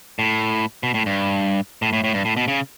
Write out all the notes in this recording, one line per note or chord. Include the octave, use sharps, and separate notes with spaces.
A2
B2
A2
G2
A2
A2
A2
G2
A2
B2
C#3